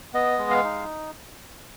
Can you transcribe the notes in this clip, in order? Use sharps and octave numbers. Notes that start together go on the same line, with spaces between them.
B3 D#5
G#3
F5
D#4